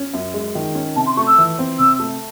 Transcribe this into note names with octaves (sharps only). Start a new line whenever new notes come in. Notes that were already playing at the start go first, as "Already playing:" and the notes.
Already playing: C#4
F#2
G#3
D#3
C#4
C3 A5
C6
A3 C#6
E6
E3
C4
C3 E6
A3